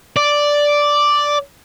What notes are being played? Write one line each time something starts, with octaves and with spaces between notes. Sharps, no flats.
D5